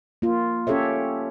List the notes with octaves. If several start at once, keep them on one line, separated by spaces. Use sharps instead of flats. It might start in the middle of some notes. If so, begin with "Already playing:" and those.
A#3 F4
C#4 G4 A4 C#5 E5